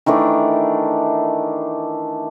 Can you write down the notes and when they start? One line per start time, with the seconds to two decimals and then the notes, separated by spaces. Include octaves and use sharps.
0.06 D#3 E3 A3 D4